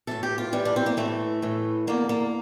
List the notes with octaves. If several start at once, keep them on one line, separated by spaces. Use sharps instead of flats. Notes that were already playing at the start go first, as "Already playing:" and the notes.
A2 E3 A4
G4
F4
A2 E3 G3
D4
C4
A#3
A2 E3 A3
A2 E3
E2 D3 A#3
A#3